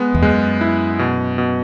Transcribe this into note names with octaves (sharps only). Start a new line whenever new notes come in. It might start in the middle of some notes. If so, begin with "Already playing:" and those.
Already playing: G#3 B3
E2
F#2 G#3
E4
B2
B2